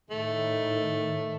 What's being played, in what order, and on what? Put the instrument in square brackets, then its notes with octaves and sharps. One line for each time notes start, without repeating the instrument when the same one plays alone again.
[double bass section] A2 D#3 [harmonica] A3